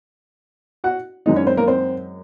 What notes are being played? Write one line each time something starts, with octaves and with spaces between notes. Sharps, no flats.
F#4 F#5
F#2 D#3 G#3 C4 D#4 D#5
C#4 C#5
C4 C5
A#3 A#4
C4 C5